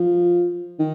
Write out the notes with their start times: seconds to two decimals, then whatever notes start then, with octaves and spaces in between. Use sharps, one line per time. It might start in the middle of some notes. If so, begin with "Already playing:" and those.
Already playing: F3
0.79 D#3